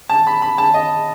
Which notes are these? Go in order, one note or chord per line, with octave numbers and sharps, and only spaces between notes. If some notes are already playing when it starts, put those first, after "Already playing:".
A5
B5
B5
A5
D#5